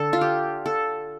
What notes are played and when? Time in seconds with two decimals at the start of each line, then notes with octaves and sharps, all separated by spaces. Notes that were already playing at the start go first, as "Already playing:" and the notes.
Already playing: D3 A4
0.13 F4
0.21 G4
0.66 A4